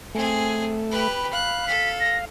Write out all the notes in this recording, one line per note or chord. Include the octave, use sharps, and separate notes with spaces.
A3 C4 G#4 G#5
G4 B4 B5
F5 F#6
A4 B6
A#6